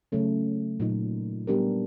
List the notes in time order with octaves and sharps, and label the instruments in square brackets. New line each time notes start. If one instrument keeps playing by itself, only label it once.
[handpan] C#3 F#3 A3 C#4
A#2 F#3 A#3 D#4
G3 B3 D4 G4 A#4